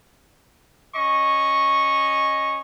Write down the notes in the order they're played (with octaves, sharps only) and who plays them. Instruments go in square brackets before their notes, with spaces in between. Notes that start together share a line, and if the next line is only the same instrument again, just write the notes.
[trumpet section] C#4 D#5 C#6